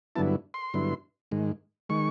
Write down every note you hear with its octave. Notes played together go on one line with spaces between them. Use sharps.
G2 D3 F#3 B3 E4 A5
C6
G2 D3 F#3 B3 E4
G#2 D#3 G#3
D#3 G#3 C#6